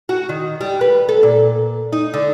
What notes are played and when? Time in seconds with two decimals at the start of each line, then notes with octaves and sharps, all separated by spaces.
0.09 F#4
0.29 D#3
0.61 G3
0.81 B4
1.09 A4
1.23 A#2
1.93 D#4
2.14 D3